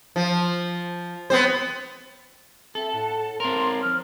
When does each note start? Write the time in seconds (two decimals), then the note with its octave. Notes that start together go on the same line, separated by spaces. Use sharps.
0.16 F3
1.30 B3 C4 C5
2.75 C4 A4 E5
2.92 A2 F#5 A5
3.40 C4 A#4 C#5 A5 C6
3.82 F3 F6